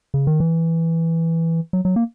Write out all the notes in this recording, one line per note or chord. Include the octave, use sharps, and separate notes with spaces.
C#3
D#3
E3
F#3
F#3
A#3